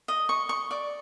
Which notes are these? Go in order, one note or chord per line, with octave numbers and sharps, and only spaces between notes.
D#5
C#6
C#6
D5